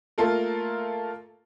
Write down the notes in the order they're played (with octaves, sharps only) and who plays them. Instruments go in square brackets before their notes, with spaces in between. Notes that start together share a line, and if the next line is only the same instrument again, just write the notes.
[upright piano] A3 A#3 F4 A4 A#4